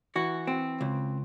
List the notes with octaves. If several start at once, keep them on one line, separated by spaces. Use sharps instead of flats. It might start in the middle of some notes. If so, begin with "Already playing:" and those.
E3 F#4
C4
C#2